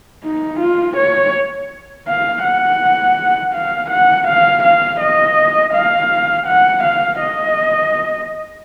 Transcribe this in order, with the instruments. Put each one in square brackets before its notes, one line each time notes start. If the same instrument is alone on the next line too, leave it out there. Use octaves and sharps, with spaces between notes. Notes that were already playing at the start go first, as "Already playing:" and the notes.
[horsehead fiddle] D#4
F4
C#5
F5
F#5
F5
F#5
F5
F5
D#5
F5
F#5
F5
D#5